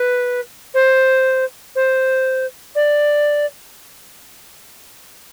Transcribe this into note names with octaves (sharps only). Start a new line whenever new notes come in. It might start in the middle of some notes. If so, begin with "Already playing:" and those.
Already playing: B4
C5
C5
D5